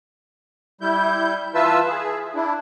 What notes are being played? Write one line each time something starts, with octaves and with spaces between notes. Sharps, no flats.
G3 E4 G6
E3 F4 B4 E5 A5 E6
G#4
D4 E4